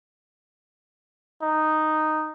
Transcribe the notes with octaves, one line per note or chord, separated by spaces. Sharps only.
D#4